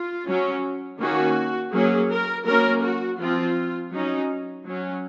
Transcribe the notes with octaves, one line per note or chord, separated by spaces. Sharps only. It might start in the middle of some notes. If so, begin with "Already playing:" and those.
Already playing: F4
F#3 C#4
D#3 A#3 C#4 F#4
F#3 A#3 C#4 G#4
A#4
F#3 A#3 C#4 A#4
F#4
F3 C4 F4
F#3 C#4 D#4
F#3 C#4